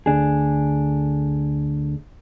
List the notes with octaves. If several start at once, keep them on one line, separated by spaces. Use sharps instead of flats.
D2 D4 G#4